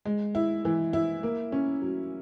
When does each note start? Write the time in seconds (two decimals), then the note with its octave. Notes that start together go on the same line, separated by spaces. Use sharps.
0.05 G#3
0.35 E4
0.65 E3
0.93 E4
1.23 A#3
1.52 C#4
1.82 F#3